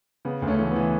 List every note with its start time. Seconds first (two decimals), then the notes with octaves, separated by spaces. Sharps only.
0.25 C#3 B3
0.42 D2
0.47 A3 C#4
0.59 E3 A3
0.71 B3
0.76 E3